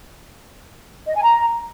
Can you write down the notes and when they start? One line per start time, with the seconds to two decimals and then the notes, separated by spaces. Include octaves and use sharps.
1.07 D#5
1.15 G#5
1.23 A#5